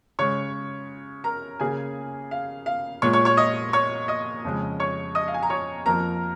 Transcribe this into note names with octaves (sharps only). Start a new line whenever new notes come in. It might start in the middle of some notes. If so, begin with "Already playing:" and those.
C#3 G#3 C#5 C#6
A#4 A#5
C#3 A#3 G#4 G#5
F5
F5
A#2 G#3 C#5 C#6
C#5 C#6
C#5 C#6
D#5 D#6
C#5 C#6
D#5 D#6
F2 C#3 G#3
C#5 C#6
D#5 D#6
F5
G#5
A#5
C#5 C#6
F2 F3 A#3 A#4 A#5